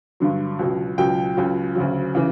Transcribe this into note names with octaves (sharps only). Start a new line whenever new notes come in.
G2 D3 F#3
C#2 B2 F#3
C#2 B2 F#3 G5
C#2 C#3 F#3
D2 C#3 F#3
C#3 E3